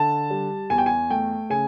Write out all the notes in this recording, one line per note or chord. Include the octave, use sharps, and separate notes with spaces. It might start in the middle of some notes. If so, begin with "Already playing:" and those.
Already playing: D3 A5
G3
E2 G#5
G5
G#5
A3 G5
C#3 G#5